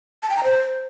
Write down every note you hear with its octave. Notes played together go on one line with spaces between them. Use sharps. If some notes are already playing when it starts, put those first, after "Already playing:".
A5
G5
A#5
C5